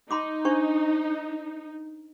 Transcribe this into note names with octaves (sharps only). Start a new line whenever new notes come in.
D#4 B5 C6 D6
D4 C5 C#6